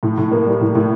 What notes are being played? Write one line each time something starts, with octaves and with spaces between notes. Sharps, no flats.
A2
A2
A#3
G3
A2
A2